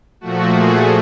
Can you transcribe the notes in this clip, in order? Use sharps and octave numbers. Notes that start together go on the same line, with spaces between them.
A#2 F3 A3 F#4
F#4 G#4